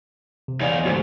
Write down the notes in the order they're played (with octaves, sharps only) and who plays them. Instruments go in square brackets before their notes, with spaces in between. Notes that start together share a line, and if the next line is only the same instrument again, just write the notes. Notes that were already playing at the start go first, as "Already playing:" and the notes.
[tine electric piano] C3
[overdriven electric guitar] E2 D#4 [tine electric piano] C#5 D5 F5
[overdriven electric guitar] D2 G#2 [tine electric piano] F3 F#4 G4